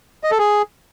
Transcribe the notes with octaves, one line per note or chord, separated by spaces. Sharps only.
D#5
A4
G#4